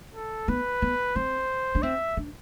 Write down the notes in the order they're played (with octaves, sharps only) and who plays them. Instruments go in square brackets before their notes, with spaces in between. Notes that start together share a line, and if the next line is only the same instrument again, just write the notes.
[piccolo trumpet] A4
[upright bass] B3 [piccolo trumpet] B4
[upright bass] B3
[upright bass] C4 [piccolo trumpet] C5
[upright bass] D4
[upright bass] C4 [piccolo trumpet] E5
[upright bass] D4